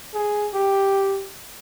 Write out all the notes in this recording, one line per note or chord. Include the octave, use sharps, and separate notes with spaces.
G#4
G4